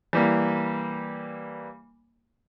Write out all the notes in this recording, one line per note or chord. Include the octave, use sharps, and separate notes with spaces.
E3 G3 A#3